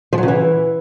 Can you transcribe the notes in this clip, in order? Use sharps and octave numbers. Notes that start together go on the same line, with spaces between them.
F3
F#3
C#3
E3